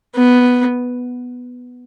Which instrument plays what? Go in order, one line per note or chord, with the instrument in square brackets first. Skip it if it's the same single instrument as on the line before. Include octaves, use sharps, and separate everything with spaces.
[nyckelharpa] B3